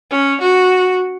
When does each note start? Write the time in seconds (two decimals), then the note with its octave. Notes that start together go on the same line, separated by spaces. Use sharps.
0.11 C#4
0.41 F#4